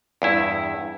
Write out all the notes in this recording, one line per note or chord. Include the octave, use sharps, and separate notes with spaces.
E2 G2 E4